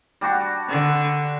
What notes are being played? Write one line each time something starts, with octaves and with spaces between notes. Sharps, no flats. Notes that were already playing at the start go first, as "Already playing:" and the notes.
G3 D4 F#4
D3